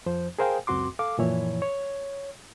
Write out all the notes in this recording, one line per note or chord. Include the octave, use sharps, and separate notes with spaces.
F2 F3 C5
G#4 A#4 C5 F5 G5 G#5
C#2 F#2 C4 F#4 C6 D6
A4 F5 D6
F#2 A#2 E3 F3 E4 C#5
C#5